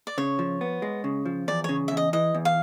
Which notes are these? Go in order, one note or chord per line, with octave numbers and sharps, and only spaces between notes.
D5
C#3 C#5
F3
B3
G#3
C#3
F3
E2 D5
C#3 C#5
E5
E2
D#5
E3 D#5
E2
F5